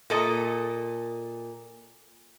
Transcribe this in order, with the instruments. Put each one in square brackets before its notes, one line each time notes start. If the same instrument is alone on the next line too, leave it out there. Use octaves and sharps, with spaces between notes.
[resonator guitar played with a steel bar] A#2 A4 D#5